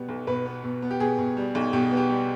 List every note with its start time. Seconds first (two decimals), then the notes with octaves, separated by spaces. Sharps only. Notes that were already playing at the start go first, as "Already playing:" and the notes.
Already playing: B2 G3 B3
0.09 B1
0.27 B2 B4
0.46 B3
0.64 B2
0.82 B3
0.91 G4
1.00 B2 G#4
1.18 B2
1.37 G3
1.55 B1
1.73 B2 G4
1.91 B3
1.97 G4
2.09 G3